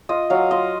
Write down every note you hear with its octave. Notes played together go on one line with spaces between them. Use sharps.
F4 D#5
F#3 F5
F4 D#5